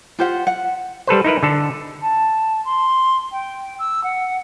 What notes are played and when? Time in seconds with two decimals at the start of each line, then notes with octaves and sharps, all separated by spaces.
0.19 F4 G4 C5 F#5
0.47 F#5
1.07 G3 A4 B4 C5
1.24 D#4 E4 A#4 B4
1.43 D3 A4
2.02 A5
2.65 C6
3.32 G5
3.79 E6
4.03 F#5